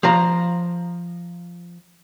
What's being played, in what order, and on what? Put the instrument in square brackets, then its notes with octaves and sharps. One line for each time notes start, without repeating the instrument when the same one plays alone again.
[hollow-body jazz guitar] F3 F5 A#5